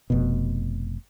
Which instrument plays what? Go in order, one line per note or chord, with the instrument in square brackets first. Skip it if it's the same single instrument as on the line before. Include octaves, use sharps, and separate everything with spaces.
[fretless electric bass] F1 B2